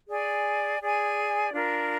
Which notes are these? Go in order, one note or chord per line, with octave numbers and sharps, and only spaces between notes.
G#4 D5 G#5
G#4 D5 G#5
D4 F4 A#4